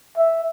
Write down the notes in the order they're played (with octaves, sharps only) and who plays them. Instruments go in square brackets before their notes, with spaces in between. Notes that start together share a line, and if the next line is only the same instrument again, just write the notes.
[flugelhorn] E5